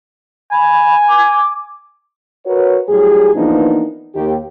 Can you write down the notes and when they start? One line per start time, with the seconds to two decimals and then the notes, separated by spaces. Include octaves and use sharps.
0.52 G#5 B5
1.08 D6
2.46 F#4 A#4 B4 C#5
2.89 A2 F#3 G3 G4 G#4
3.35 E3 F3 A#3 B3 D4 D#4
4.15 D#2 G4